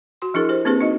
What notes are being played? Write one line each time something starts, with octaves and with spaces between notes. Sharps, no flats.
F#4 C6
F3 D4 E4 G#4 A#4
G4 C5
A#3 C4 D4 G4 G#4 B4
D#4 F#4 D#5